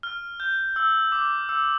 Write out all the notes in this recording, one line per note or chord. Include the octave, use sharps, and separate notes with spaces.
F6
G6
E6
D6
E6